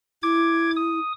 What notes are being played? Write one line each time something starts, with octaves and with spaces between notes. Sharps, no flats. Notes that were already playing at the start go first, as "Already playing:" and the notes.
E4 D6 G#6
D#6